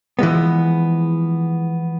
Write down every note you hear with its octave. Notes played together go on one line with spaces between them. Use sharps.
E3 F3 G#3 B3